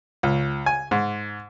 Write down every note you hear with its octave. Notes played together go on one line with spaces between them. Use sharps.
C#2
G#5
G#2